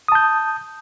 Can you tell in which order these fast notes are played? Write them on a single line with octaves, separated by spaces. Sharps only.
D#6 A5 G6